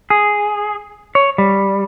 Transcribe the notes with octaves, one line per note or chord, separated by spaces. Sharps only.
G#4
C#5
G3